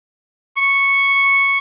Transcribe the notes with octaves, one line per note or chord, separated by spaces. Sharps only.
C#6